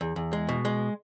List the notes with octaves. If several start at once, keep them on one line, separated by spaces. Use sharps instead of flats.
E2
E2
G#3
B2
G#3